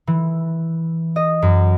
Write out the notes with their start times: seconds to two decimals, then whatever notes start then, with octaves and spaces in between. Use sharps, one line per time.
0.07 E3
1.16 D#5
1.42 F#2